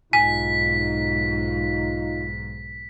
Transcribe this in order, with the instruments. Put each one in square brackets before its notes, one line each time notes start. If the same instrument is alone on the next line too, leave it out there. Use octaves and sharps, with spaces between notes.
[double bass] B1 G#2 [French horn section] D#4 F4 [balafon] G#5 [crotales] B6